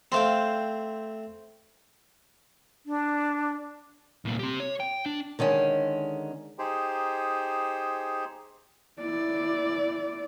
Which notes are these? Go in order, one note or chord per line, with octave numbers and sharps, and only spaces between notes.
A3 C4 C5 F5 G5
D4
C2 A#2
C4 G4
C#5
G5
D4
D3 D#3 G#3 C#4
D#4 G4 G#4 C5
E4 D5